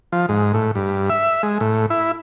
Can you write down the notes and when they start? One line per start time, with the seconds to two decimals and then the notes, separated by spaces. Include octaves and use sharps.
0.12 F3
0.29 G#2
0.54 A2
0.75 G2
1.10 E5
1.43 G#3
1.60 A2
1.90 E4